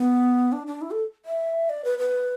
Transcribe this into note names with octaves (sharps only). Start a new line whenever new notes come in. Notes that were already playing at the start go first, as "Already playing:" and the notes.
Already playing: B3
D4
D4
E4
A4
E5
D5
B4
B4